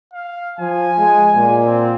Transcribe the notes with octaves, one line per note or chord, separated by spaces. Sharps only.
F5
F3 G#5
G#3
A#2
C4